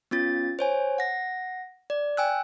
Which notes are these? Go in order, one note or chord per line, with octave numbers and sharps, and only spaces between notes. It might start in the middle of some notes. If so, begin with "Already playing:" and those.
B3 C#4 F4 A6
C5 C#5 G#5
F#5 A#6
D5
G5 G#5 E6 F#6